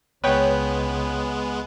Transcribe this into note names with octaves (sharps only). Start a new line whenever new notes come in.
C#2 C#3 G#3 B3 B4 C#5 G5